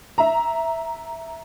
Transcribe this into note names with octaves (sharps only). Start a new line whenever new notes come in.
E5 A#5